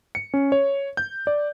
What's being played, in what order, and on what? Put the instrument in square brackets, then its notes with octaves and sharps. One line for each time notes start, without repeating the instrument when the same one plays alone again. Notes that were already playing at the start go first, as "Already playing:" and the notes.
[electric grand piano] C#7
C#4
C#5
G6
D5